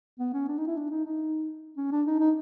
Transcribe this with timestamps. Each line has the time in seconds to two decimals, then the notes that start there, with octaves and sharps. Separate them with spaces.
0.19 B3
0.34 C#4
0.48 D4
0.58 D#4
0.67 E4
0.77 D4
0.91 D#4
1.06 D#4
1.77 C#4
1.92 D4
2.07 D#4
2.20 D#4